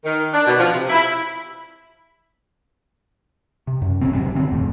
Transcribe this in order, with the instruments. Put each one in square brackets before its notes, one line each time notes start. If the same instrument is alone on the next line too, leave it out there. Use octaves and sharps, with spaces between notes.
[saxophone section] D#3
D4
B2
F3
C3
E4
[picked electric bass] C3
F#2
D#1 A#1 C#3 C4
G#1 F#2 C3
D3 D#3 C4
D#1 F2 A2